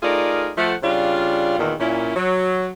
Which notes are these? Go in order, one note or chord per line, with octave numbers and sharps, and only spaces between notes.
A3 D#4 F4 G#4 A#4 D5
F3 A3 F#5
C#3 G3 D4 F4
E2 A#2 D#3
A#2 C#4 E4
F#3